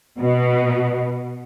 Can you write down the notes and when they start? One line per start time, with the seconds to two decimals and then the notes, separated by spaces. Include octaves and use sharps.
0.19 B2